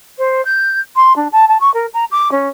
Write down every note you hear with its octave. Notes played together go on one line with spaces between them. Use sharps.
C5
G6
C6
D4
A5
A5
C#6
A#4
A#5
D6
C#4